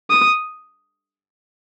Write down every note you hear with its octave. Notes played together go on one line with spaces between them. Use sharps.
D#6